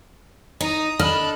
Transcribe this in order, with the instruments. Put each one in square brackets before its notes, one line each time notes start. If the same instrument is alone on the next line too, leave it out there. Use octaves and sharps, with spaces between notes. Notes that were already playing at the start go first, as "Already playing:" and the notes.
[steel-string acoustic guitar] D#4 [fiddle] A#5 D#6
[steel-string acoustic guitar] D4 A4 [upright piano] D#5 F6 [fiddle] B5 F#6